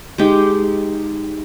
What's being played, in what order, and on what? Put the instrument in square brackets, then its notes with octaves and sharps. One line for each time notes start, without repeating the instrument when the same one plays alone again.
[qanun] G#3 D#4 G4